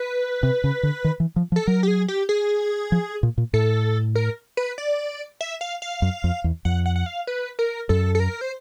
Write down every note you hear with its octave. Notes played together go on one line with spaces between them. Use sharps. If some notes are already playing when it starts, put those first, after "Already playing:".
Already playing: B4
C3
C#3
D3
D#3
E3
F3
F3
A4
F#3 A#4
G4
G#4
G4
G#4
F3
A#2
A#2
A2 A4
A#4
B4
D5
E5
F5
F5
F#2
F2
E2
F2 F#5
F#5
F#5
F5
B4
A#4
F#2 A4
A4
A#4
C5